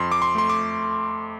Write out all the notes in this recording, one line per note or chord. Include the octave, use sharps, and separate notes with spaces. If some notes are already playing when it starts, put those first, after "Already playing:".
Already playing: F2 C6
D6
C6
A3 C6
D6